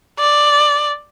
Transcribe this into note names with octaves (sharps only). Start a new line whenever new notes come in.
D5